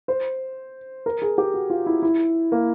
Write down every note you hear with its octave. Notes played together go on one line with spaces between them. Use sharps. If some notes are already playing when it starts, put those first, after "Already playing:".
C5
A#4
G#4
G4
F#4
F4
E4
E4
A#3